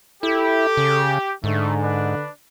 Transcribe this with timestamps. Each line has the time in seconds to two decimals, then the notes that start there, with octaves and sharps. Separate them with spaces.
0.23 E4 G4 A4
0.77 C#3
1.44 G#2 D3 A3
1.82 D4 B4